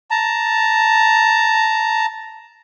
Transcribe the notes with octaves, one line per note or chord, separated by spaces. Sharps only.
A5 A#5